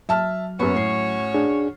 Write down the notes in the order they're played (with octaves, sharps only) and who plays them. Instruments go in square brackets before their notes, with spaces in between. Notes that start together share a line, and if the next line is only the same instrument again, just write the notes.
[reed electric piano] F#3 [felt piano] E5 A5 F6
[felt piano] F#2 B3 [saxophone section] C#4 F#4 C#5
[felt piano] A2 C7
[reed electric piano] D4 G#4